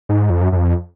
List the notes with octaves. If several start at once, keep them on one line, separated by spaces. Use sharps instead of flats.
G#2
F2
F#2
F#2
F2